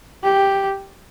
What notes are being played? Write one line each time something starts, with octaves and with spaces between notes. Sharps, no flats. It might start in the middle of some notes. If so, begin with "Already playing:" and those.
G4